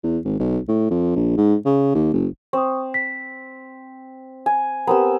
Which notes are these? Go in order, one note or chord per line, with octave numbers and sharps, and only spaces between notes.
E2
G#1
B1
A2
F2
A#1
G#2
C#3
D#2
F#1
C4 C#6 D#6
B6
G#5
B3 C4 G4 A#4 A#5 E6